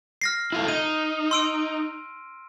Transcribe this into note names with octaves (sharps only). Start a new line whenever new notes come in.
F6 A#6 C7
E4 F4 A4
D#4 D#7
C6 E6 D7